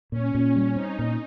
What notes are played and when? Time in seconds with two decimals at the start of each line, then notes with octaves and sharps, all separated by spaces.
0.12 A#2 C#4
0.35 A#2
0.56 G3
0.76 C4 D#4
0.99 A#2